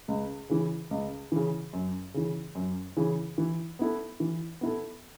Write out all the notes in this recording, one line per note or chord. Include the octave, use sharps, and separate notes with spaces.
C#2
C#3 E3
C#2
C#3 E3
F#2
C#3 E3
F#2
C#3 E3
E3
B3 E4 A4
E3
B3 E4 A4